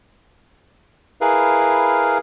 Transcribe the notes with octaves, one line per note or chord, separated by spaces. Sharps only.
E4 G#4 A#4 B4 F5